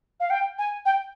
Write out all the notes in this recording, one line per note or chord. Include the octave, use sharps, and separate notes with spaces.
F5
G5
G#5
G5